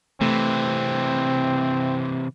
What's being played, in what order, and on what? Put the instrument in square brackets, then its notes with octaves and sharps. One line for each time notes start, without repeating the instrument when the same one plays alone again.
[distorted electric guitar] C3 E3 [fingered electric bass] A3 [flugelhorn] C4